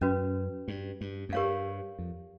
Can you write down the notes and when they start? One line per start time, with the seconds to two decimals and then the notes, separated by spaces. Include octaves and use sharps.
0.01 F#2 C#4 F#4 B4
0.68 G2
1.01 G2
1.29 F#2
1.33 G2 G4 A#4 C#5 F5
1.99 F2